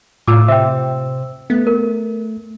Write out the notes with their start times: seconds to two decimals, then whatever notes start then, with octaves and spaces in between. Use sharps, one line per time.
0.28 A2 F4 D6 E6
0.48 C3 C5 E5 G5 E6
1.50 A3 B3
1.67 A#4